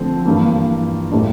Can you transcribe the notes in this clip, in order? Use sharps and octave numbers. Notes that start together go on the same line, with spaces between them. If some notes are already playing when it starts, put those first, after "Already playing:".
Already playing: D3 F3 A3 C4
G2 E3 A#3
A2 G3 A#3 D4